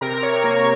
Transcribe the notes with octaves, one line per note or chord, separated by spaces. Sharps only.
C3 A#4 A#5
C3 C#5 C#6
A#3 C#5 C#6